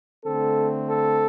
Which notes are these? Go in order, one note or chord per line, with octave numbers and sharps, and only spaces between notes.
D3 A3 C4 A4
A4